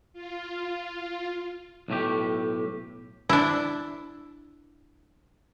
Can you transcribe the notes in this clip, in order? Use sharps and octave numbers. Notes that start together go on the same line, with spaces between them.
F4
B1 A2 A3 G4
D4 E4